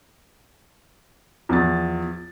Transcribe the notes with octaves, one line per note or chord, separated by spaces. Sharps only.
E2 F3 A6